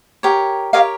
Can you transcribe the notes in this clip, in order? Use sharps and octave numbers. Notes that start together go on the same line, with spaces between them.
G4 A#4 C#5
G4 A#4 C#5 D#5 F5